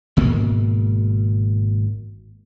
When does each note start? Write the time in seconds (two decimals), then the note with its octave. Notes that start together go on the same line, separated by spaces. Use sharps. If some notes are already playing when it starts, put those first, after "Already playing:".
0.17 G#1 G#2 B2 A#3